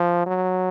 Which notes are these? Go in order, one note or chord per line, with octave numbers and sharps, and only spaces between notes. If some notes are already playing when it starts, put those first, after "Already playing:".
Already playing: F3
F#3